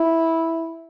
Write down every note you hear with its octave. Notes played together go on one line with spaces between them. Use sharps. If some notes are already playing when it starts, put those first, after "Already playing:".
Already playing: E4